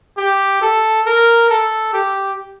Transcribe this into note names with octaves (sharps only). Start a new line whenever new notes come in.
G4
A4
A#4
A4
G4